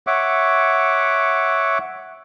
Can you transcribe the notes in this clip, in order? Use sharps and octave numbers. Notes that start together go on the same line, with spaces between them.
C#5 E5 F#5 D6